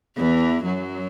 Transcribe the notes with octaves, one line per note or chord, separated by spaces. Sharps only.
E2 E3
F#2 F#3